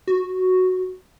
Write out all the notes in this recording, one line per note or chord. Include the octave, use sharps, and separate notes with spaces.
F#4